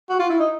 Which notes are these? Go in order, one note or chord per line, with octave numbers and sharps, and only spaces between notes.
F#4
F4
E4
D#4